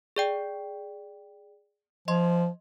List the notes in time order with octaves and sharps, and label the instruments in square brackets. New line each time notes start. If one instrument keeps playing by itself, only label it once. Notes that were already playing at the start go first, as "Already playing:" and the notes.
[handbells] G#4 D5 G5
[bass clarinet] F3 [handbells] D#5 C6